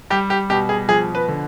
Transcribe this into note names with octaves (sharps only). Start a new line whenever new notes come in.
G3 G4
G4
B2 G4
G#4
F3 G#4
B4
D3